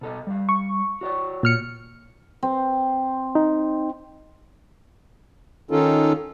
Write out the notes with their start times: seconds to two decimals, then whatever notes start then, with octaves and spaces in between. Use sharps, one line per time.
0.01 B2 A4 D#5
0.27 G3 F5
0.49 C#6
1.01 F#4 C#5 D5
1.43 A#2 F6 C#7
2.43 C4
3.35 D#4
5.71 D#3 C#4 D#4 F4 A4